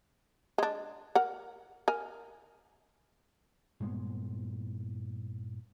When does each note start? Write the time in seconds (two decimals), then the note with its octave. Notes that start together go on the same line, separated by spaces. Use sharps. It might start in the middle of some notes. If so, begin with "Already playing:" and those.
0.58 G#3 D4
1.15 A#4 F#5
1.88 A#4 G#5
3.80 G2 A#2 G#3 B3